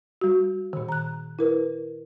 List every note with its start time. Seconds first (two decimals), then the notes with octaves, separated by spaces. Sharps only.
0.21 G3 F#4
0.73 A#2 D#3
0.89 A#5 F#6
1.39 E4 A#4 B4